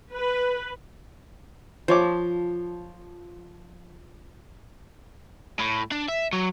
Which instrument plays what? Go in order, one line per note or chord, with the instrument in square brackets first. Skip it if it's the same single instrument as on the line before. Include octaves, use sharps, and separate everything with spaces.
[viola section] B4
[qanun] F3 [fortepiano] C5 C#5 D6
[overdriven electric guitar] A2
D4
E5
F#3